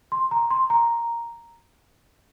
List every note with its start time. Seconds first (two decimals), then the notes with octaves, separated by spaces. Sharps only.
0.12 C6
0.31 A#5
0.51 C6
0.70 A#5